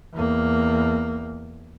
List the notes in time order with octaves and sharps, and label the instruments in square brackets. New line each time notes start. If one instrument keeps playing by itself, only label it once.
[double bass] E2 A#3